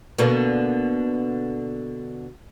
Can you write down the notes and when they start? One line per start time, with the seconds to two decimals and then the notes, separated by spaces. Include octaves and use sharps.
0.19 B2 D3 A#3